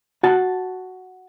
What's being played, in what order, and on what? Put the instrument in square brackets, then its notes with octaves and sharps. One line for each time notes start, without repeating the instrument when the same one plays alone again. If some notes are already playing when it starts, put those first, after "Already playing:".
[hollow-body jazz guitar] F#4 A5